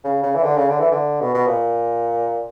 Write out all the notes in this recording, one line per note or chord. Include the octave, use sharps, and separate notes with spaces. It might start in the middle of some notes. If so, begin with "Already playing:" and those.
C#3
C#3
E3
D3
C#3
D3
E3
D3
B2
B2
A#2